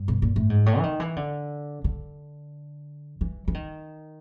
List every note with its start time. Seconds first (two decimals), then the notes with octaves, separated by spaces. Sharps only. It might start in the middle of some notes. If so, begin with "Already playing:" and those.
Already playing: G2
0.08 B2
0.22 A#2
0.36 A2
0.50 G#2
0.66 A2
0.78 E3
0.83 D#3
1.00 E3
1.16 D3
1.84 D3
3.21 E3
3.48 E3
3.54 D#3